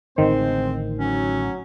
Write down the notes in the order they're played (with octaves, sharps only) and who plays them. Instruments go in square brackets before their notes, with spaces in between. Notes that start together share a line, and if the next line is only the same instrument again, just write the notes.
[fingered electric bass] A1 A2 D3 [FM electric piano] D#3 [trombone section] G#3 C5 [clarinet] C4
[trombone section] F#3 [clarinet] C#4